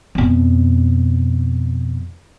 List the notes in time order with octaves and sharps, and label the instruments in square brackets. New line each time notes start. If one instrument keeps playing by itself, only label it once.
[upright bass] F2 B2